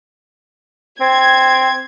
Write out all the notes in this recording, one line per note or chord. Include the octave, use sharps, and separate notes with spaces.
C4 G#6